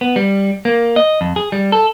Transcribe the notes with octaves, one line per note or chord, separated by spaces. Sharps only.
B3
G3
A#3
D#5
F2
G#4
G3
A4